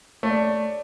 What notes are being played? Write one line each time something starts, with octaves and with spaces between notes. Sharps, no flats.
A3 C#5
D5